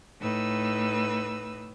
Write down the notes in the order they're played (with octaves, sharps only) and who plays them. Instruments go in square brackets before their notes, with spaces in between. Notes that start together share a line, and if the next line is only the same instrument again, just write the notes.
[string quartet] A2 D#4 B4 E6